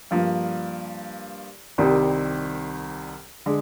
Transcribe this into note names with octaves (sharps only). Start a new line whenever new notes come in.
G2 F3 A#3
C2 C3 D#3 G3 C4
D3 G#3